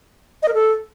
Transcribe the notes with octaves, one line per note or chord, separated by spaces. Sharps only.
D#5
A#4
A4